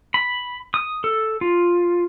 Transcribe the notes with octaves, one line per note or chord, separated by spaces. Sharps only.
B5
D#6
A4
F4